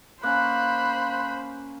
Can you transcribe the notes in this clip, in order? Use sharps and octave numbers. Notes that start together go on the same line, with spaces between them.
A#3 C#4 C5 B5 F#6